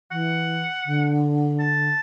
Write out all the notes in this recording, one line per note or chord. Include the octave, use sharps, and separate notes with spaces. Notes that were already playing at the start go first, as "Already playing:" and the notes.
E3 F#5
D3
A5